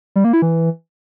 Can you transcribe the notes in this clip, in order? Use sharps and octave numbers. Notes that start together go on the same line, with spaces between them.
G3
A#3
E4
E3